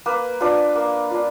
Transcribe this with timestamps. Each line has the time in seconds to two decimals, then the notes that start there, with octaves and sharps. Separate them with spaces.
0.06 A#3 B4
0.41 D4 F4 B4
0.75 A#3
1.11 D4 F4